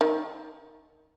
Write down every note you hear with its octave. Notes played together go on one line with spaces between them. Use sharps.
D#3